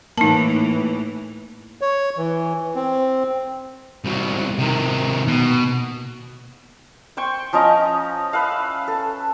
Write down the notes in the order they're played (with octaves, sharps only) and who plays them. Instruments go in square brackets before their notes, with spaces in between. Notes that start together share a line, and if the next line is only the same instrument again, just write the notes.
[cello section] A2 E3 [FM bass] A#3 [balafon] D#4 A5
[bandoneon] C#5
E3
C4
[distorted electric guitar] C2 F#3
C3 D#3
B2
[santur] C5 G5 C6 C#6
F3 C#4 D#5 A#5
B4 E5 F5
A4